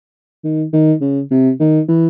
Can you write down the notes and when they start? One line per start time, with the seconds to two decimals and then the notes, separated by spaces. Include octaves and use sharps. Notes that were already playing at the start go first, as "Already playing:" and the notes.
0.44 D#3
0.73 D#3
1.01 C#3
1.31 C3
1.60 D#3
1.88 E3